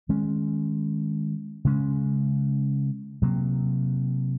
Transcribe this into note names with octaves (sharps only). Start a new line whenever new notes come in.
D#3 G#3 C#4
C#3 G#3 C#4
C3 F#3 A#3